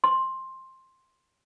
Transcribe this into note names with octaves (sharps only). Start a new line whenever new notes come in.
C6